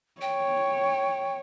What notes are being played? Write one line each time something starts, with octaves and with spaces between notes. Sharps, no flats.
C#5 G5